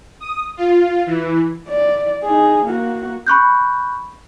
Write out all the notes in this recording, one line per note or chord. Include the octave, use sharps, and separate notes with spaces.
D#6
F4
E3
D5
D#4 G#4
A#3 F#4
B5 C#6 F#6 G6